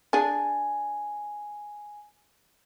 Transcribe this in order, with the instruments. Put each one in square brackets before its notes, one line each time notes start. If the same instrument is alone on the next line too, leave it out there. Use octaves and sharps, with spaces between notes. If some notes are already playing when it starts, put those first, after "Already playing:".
[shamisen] D4 G#4 [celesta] G#5